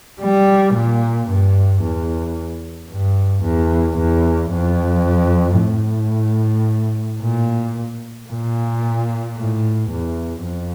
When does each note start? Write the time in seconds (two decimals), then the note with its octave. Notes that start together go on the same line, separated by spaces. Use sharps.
0.20 G3
0.75 A#2
1.28 G2
1.83 E2
2.91 G2
3.44 E2
3.98 E2
4.51 F2
5.60 A2
7.21 A#2
8.29 A#2
9.37 A2
9.91 E2
10.44 F2